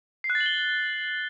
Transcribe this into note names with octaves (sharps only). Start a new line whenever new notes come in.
C7
F#6
A6
F#7
G7